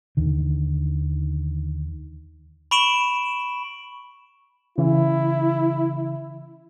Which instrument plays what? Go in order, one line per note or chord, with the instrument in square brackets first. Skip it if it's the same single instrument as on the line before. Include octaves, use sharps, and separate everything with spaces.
[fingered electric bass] D#2 D3 D#3
[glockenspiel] B5 C#6 D7 E7 F#7
[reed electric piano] C#3 E3 [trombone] E4